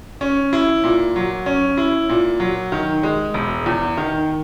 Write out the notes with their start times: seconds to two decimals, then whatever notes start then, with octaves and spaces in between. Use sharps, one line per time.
0.21 C#4
0.53 E4
0.84 A#2
1.16 F#3
1.46 C#4
1.78 E4
2.09 A#2
2.40 F#3
2.72 D#3
3.03 G#3
3.34 E1
3.66 E2
3.97 D#3